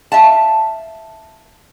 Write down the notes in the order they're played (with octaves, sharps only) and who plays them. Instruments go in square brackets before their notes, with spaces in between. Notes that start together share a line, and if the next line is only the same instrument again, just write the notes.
[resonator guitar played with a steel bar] E5 F5 A5